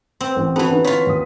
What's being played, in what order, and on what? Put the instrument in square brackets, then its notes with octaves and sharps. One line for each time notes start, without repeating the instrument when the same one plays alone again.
[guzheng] C4
[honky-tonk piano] A1
[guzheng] E3 B3 [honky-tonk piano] C4 F#4 A5
[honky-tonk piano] D3 C#4 D#4
[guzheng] E3 F4 [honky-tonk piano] C#5 B6
[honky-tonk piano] D#2 D#6